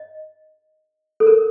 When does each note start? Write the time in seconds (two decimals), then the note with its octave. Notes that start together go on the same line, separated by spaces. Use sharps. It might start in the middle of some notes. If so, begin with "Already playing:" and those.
Already playing: D#5
1.20 A4
1.27 A#4